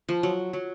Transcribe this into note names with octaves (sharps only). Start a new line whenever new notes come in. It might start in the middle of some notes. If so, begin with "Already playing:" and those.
F3
F#3
F#3